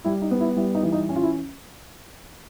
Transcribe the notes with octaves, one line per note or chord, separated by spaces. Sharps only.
G3 E4
D#4
B3
E4
G3 E4
D#4
E3
D#4
C#4
F4
E4